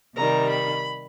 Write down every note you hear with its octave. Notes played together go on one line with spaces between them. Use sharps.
C3 D#3 G3 A#5
B5